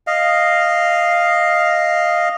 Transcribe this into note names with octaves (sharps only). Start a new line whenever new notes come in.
D#5 F5